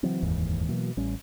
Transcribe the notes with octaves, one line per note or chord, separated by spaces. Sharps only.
C#3 E3 F#3 C4
F1 D#2 G#2 E3
B2 E3 F#3 A#3
A1 G3 C#4